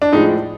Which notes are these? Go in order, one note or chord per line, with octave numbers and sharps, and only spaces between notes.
D4
A2 F3 G#3 D#4